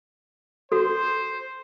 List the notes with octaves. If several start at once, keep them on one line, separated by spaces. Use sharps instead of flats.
F#4 A4 C5